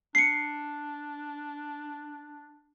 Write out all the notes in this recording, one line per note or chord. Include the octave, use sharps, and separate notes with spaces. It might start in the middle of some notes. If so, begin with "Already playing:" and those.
D4 C7 C#7